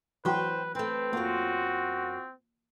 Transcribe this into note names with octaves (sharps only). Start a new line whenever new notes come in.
E3 F#3 F#4 B4 C5 G5
A3 C4 B4 G5
F#2 A#3 F4 F#4